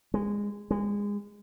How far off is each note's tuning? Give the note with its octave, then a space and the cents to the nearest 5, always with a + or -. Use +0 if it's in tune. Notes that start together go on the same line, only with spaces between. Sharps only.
G#3 -20
G#3 -25